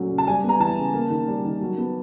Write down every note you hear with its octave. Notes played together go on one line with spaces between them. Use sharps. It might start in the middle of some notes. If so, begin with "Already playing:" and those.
Already playing: A#2 F#3 A3 C#4
C#3
A5
G3 G#5
B3 A#5
E3 A5
C#3
A#3
D#3
G3
D#3
F#3
B3